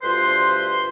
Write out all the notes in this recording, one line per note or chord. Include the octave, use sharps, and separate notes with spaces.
D2 G2 F4 B4 C5 C6